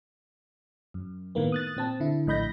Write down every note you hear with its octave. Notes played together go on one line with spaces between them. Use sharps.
F#2
A2 D#3 A#3 B3
D#6 F#6 A6
A#2 C4 A5
D3 E4
A#1 A2 D#5 B5 G6 A#6